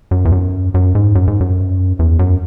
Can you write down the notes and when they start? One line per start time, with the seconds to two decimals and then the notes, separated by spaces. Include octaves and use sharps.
0.11 F#2
0.25 E2
0.32 F#2
0.74 F#2
0.95 G#2
1.15 F#2
1.28 G#2
1.41 F#2
1.99 E2
2.19 F#2